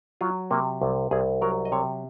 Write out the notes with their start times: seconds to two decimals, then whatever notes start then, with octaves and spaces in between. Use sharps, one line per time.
0.21 F#3 F4
0.51 C3 A#3
0.82 C2
1.11 C2 G#4
1.42 F#3 A#4
1.65 D#5
1.72 C3 C#5